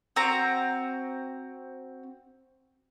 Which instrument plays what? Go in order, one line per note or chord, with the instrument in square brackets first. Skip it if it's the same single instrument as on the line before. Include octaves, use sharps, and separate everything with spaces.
[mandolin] C4 F#4 A#5